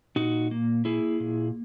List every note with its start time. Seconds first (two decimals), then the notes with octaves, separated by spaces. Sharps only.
0.16 A#2 D#4 F#4
0.51 A#3
0.85 A#3 E4 G#4
1.20 A#2